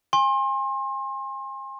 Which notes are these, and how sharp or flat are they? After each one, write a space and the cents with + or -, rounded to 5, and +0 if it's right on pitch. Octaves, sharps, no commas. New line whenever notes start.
G#5 -30 C6 +35